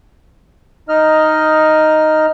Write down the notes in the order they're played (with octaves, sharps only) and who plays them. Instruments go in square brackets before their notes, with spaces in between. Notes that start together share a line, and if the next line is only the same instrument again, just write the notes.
[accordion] D#4 D#5 F6